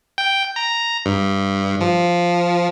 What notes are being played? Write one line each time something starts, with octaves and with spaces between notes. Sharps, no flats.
G5
A#5
G2
F3